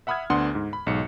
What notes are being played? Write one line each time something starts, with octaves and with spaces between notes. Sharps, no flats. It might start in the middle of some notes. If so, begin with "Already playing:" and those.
E5 F#5 B5 D#6 F6 G#6
D2 B3 D4 F#5 C6 D#6
G#2
B5
B1 G#2 C#7